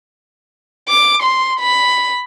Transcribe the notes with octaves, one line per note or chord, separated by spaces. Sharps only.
D6
C6
B5